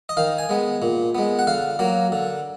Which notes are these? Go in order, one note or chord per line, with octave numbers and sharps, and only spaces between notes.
D#5
D#3 F5
G#5
G#3 B3
A#2
G#3 B3
F#5
D3 F5
F#3 A#3
D3